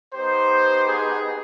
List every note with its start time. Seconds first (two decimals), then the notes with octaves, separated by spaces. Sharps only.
0.14 B3 D#4 G4 C5
0.88 G#4